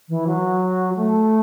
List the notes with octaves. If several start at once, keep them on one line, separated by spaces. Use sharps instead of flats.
E3
F#3
A3